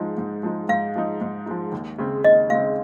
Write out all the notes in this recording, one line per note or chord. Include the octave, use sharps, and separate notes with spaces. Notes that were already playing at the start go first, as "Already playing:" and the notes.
Already playing: G#2 F3 G#3 D#4
G#2
F3 G#3 D#4
G#2 F5
F3 G#3 D#4
G#2
F3 G#3 D#4
D#2
C#3 G#3 C4
D#2 D#5
C#3 G#3 C4 F5